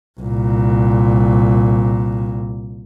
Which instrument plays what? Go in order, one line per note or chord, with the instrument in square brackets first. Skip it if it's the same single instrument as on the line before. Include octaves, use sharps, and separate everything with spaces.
[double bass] C2 A#2